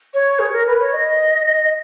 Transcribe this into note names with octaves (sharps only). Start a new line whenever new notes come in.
C#5
G#4
A#4
B4
C#5
D#5